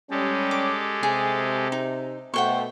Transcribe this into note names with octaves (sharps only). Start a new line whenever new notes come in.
G3 G#3 C#4 G4 A4
D6
C3 G#4
D#4
B2 A3 C5 F#5 G5 C#6